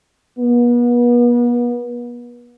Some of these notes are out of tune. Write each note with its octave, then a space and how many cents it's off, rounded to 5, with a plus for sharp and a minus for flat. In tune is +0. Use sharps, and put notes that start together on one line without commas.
B3 -40